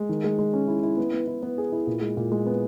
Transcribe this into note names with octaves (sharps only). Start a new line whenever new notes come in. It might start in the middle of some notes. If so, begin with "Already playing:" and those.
Already playing: G#3
D#3
G#3
G#3
C#4
E4
E4
B3
B3
E4
B3
G#4
E4
A#2
G#3
A#2
G#3
B3